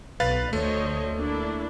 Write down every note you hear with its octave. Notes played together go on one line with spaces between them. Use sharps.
B1 B4 F5 A6
D2 A3 C5 C#5 D#5
A#3 D4 E4